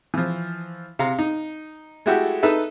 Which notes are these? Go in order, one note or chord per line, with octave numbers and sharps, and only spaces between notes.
E3 F3
C3 F5 A#5
D#4
G#3 A3 E4 F#4 G4 A4
D#4 A4 B4 E5